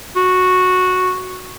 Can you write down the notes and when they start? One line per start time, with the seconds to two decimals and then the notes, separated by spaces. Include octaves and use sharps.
0.16 F#4